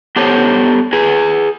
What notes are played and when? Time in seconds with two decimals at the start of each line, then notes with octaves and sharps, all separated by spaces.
0.16 B3 G4 A4 C5 C#5
0.93 G#4 B4